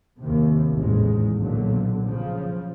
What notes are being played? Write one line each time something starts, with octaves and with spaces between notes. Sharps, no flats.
D#2 C3
A1 E2 G#2 G#3
B1 A#2 D3 F#3
C#3 F3